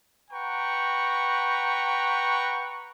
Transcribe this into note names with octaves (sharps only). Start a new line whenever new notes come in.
B4 F#5 G5 A#5 C#6